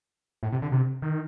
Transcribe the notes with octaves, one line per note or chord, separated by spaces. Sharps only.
A2
C3
D3
C3
D#3